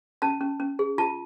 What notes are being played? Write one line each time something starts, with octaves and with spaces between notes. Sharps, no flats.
C#4 A5
C#4
C#4
G#4
F4 A5